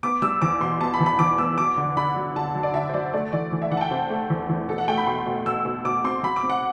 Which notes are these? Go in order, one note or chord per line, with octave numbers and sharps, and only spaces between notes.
B3 D6
G3 E6
E2 D6
B2 C6
B3 A5
B5
E2
B5
E2 D6
B3 E6
F#3 D6
D3
D3 B5
F#3
D3 A5
F#3
D5
D3 E5
C5
F#3 D5
A3 D5
E3 D5
E3
E5
E3 F#5
A5
G5
C3 C5
A3
E2
E2
B2 A4
F#5
A3 G5
B5
B2 C6
B2
B2 E6
B2
B2 D6
C4 C6
F#3 B5
D6
C4
F#5